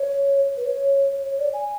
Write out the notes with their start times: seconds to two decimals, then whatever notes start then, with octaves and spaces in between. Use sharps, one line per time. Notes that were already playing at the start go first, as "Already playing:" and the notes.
Already playing: C#5
0.57 B4
0.65 C#5
1.23 C#5
1.38 D5
1.53 G#5